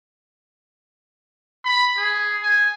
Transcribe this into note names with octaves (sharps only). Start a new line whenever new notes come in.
B5
G#4
G#5